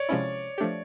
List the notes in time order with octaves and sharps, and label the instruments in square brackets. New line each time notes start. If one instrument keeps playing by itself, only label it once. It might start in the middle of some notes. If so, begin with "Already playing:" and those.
Already playing: [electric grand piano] C#5 D5
[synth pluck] C3 F3 G#3 C#4 E4
F3 A3 D4 G4